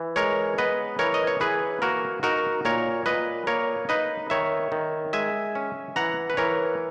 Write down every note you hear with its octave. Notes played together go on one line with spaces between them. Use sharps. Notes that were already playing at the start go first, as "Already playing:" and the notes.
Already playing: E3
G#3 A#4 C#5
B3 B4 D#5
E3 A#4 C#5
D#5
C#5
E3 G#4 B4
A#3 F#4 A#4
D#4 F#4 A#4
A#2 A#4 C#5
A#2 B4 D#5
A#3 A#4 C#5
D#4 B4 D#5
D#3 C#5 E5
D#3
G#3 E5 G#5
C#4
E3 F#5 A#5
B4
E3 A#4 C#5